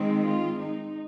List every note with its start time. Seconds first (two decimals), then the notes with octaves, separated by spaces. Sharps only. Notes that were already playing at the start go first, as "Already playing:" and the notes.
Already playing: D#3 G#3 C4
0.22 F4
0.60 D#4